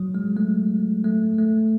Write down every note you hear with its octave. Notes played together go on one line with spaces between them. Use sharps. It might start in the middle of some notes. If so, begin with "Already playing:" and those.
Already playing: F#3
G#3
A3
A3
A3